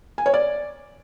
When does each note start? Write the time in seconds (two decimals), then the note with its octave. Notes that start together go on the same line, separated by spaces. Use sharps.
0.18 G#5
0.26 C#5
0.34 D5